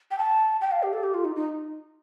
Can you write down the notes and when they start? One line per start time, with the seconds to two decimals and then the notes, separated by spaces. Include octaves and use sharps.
0.11 G5
0.18 A5
0.61 G5
0.72 F5
0.83 G4
0.93 A4
1.03 G4
1.14 F4
1.25 D#4
1.36 D#4